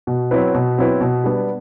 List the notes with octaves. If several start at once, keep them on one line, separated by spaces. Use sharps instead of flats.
B2
F#3 C4 E4 B4
B2
F#3 C4 E4 B4
B2
G3 B3 D4